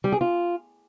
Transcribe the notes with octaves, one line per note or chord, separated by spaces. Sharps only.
G3
G#4
F4